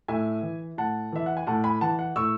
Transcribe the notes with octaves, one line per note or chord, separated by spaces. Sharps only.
A2 E5 G#5
E3
A2 F#5 A5
E3 E5
F#5
G#5
A2 F#5 A5
G#5 B5
E3 F#5 A5
F#5
A2 C#6 E6